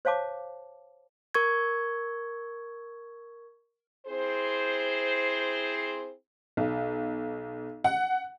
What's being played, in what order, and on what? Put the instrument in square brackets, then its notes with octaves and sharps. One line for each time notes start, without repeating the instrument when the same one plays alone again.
[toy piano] C5 C#5 F5 A5 D6
[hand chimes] A#4 C#6 G#6
[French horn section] C4 E4 G#4 C5
[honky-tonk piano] B1
F#5